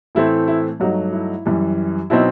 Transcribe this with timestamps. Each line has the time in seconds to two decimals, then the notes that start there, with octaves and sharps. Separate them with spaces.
0.15 A2 E3 A3 C4 E4
0.48 E4
0.80 G2 F#3 A3 D#4 F#4
1.12 E4
1.45 F#2 E3 G3
2.10 B2 F#3 C4 D#4 E4